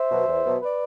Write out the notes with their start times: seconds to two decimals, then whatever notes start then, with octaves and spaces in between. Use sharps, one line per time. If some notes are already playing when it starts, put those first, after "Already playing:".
Already playing: C5 E5
0.11 B2 F#3 B3
0.28 E2
0.45 B2 F#3 B3
0.62 B4 D5